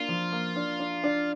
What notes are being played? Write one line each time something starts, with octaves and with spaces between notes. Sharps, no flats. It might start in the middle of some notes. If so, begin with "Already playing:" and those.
Already playing: A#3 D4 F4
F3
A#3
D4
D4
D4